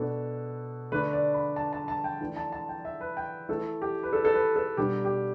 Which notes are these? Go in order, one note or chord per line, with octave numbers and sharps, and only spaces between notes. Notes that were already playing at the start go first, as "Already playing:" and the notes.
Already playing: B2 B3 D4 A4
D3 A3 D4 B4
D5
B5
A5
A5
A5
G5
E3 A3 D4
A5
A5
G5
E5
B4
G5
E3 A3 E4 A4
G4
B4
A4
A4
B4
A4
B2 G3 D4 G4
G4